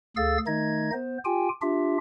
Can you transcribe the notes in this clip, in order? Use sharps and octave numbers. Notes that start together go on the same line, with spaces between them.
D2 G#4 A4 F5 E6 A6
D#3 A3 D#4 D#5 G#6
B3 C5
F4 G4 G5 G#5
D4 F4 G4 E5